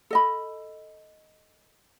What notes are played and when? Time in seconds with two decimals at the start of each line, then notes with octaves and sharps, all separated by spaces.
0.10 A4 D#5 B5